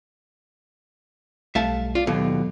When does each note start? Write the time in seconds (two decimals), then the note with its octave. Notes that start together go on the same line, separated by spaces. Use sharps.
1.55 B1 G3 A3 E5 F5 A5
1.95 F4 D5
2.07 D#2 B2 F#3 B3 A4